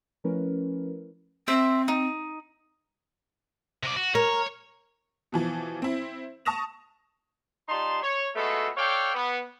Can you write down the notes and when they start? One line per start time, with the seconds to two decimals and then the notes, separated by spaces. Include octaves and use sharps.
0.24 F3 A3 C#4 E4 A#4 B4
1.48 C4 C5 E5
1.88 D#4
3.83 C3 D5
3.96 F#4
4.15 A#4 C#5
5.32 B2 E3 F3
5.82 C4 E4
6.45 A5 C#6 D#6 A#6 E7 F7
7.69 G3 D#4 F4 A5 C6
8.03 C#5
8.36 G#3 A3 B3 F4 F#4 A4
8.77 A4 C#5 D5 F5 G5
9.15 B3